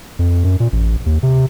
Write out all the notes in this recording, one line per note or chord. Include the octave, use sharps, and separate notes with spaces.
F2
F#2
A#2
A1
D#2
C3